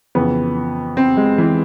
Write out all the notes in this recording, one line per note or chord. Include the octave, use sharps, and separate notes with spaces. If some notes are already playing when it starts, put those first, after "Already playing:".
F2 C#3 E3 B3
C4
G#3
E3